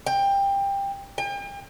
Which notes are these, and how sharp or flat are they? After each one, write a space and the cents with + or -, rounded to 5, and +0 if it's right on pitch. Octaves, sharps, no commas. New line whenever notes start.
G5 +20
G5 +40